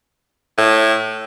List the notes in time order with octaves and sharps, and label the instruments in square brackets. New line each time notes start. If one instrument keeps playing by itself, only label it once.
[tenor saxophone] A2